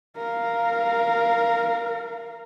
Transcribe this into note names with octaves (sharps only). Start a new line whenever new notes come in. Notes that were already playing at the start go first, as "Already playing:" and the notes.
A#4 F5